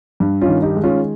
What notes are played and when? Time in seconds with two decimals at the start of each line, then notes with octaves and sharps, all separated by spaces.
0.20 G2
0.41 C#4 F4
0.48 D#3
0.62 D#4 G4
0.76 G#3
0.83 C#4 F4